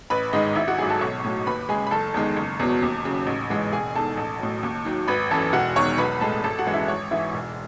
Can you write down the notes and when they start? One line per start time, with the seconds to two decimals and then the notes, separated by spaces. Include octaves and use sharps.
0.10 A1 B4 B5
0.33 G#2 D#3 G#3 D#5
0.55 G#1 E4 E5
0.68 F#4 F#5
0.78 G#2 F#3 G#4 G#5
0.90 A4 A5
1.01 B1 C#5 C#6
1.24 A2 F#3
1.46 D#2 B4 B5
1.69 C#3 G#3 G#4 G#5
1.87 B5
1.91 F#1 A4 A5
2.14 E2 D#3 G#3
2.37 F#1
2.60 E2 B2 F#3
2.83 D#2
3.05 C#3 F#3
3.27 A1
3.50 G#2 E3 G#3
3.72 E1 G#4 G#5
3.95 E2 D#3 A4 A5
4.17 A1
4.40 A2 F#3
4.63 D#2
4.85 D#3 F#3
5.08 G#1 B4 B5
5.31 F#2 E3 A4 A5
5.53 E1 F#4 F#5
5.76 E2 D#3 F#3 C#5 C#6
5.98 B1 B4 B5
6.21 A2 G#3 A4 A5
6.44 G#1 A4 A5
6.58 F#4 F#5
6.67 F#2 E3 G#3
6.73 E4 E5
6.88 G#1 C#5
7.11 G#2 E3 E4 E5
7.34 E1